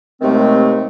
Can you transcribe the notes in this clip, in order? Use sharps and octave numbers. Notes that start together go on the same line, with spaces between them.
D#2 C3 D#3 G#3 A3 C4